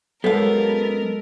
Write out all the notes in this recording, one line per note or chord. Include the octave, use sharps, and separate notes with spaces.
F#2 G#3 B3 A4 A#4 F5